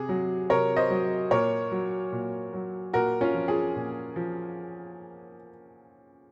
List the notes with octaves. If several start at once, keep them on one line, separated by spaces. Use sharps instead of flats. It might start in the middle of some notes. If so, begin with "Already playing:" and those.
Already playing: C3 G#4
F#3
C3 A#4 C#5
C5 D#5
F#3
A#2 A#4 C#5
F#3
A#2
F#3
A#2 F#4 A#4
C#4 F4
F3
F4 G#4
A#2
F3